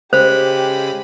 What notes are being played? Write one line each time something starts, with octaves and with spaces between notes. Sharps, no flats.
C#3 G#3 G4 C5 B5